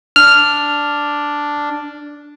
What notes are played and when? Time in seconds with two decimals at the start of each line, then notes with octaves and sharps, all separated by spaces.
0.16 D4 F6